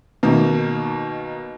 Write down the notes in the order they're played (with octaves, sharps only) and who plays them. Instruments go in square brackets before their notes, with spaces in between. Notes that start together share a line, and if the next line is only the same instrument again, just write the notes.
[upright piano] B2 D#3 A#3